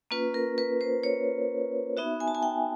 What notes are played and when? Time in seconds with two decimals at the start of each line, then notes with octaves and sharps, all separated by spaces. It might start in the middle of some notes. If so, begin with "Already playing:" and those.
0.11 A#3 C#4 F4 B4
0.34 A#4
0.58 B4
0.81 C5
1.03 C#5
1.97 B3 D#4 F#4 E5
2.20 G#5
2.28 A5
2.35 G#5
2.43 G5